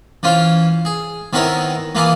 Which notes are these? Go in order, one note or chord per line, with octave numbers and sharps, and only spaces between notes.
E3 C#4 F4 C5
G#4
D#3 B3 C4 E4 A#4 C#5
E3 A#3 E4 F4 G#4